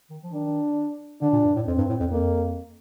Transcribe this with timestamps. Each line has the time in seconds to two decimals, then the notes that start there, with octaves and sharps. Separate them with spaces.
0.10 D#3
0.23 F3
0.32 D#3 D4
1.22 D3 D4
1.32 A#2
1.44 G2
1.55 A2
1.66 F2 C4
1.78 G2
1.89 A2
2.00 F2
2.11 F2 A#3